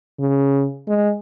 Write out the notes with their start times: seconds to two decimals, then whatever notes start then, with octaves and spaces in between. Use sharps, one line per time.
0.20 C#3
0.88 G#3